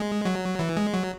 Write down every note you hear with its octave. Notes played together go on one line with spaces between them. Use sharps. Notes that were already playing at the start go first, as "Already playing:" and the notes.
Already playing: G#3
F#3
E3
G#3
F#3